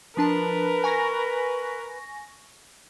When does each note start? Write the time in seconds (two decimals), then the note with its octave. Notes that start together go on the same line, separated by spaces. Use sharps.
0.17 F3 D4 A#4 B4 A5
0.84 G#5 C#6 A#6